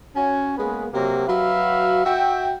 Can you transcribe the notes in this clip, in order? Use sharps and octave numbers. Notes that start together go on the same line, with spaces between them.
C#4 F#4 G#5
G#3 A#3 B3 C#4 G#4 B4
C3 F#3 A#3
F#3 F#4 B4 E5 F5
F#4 E5 G5